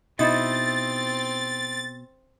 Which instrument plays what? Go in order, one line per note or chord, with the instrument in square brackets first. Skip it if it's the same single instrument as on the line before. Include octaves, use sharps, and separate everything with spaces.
[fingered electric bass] B2 [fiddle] C4 [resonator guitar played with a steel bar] D#4 E4 [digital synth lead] A6